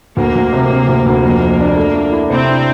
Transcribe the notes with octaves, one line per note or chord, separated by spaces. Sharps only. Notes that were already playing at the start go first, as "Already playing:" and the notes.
D2 A#3
D2
C3
C3
D2
D2
F2 A#3
F2
D4
A3
A3
E4
C3 C4
D4